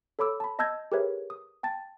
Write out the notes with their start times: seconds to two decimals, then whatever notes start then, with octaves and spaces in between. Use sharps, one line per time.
0.19 A4 C#5 B5 D6 E6
0.40 A5 B5
0.59 D#5 A5 E6 G6 G#6 A#6
0.92 G4 G#4 A#4 B4 C#5 E5
1.30 D#6
1.63 G5 A5 A6